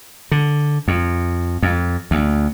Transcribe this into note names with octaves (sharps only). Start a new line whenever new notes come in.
D3
F2
F2
D2